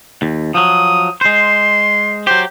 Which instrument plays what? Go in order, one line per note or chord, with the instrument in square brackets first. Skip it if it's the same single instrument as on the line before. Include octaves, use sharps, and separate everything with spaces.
[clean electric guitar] D#2
[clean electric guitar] F3 F#3 [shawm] D#6
[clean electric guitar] G#3 C5 [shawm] C6
[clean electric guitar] F#3 G4 [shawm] C5